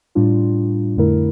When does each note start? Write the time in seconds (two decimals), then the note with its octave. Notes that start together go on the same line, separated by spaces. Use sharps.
0.15 A2 G3 D4 F4
0.97 F2 D3 A3 E4 A#4